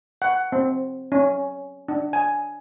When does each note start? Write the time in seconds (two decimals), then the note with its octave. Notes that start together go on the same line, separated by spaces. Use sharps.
0.22 F#5
0.52 C4
1.12 C#4
1.88 D4
2.13 G#5